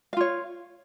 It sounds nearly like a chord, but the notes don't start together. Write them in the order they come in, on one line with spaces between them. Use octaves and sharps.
F5 F4 C#5